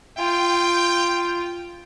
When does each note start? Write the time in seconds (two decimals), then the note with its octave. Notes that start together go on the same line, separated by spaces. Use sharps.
0.18 F4 G5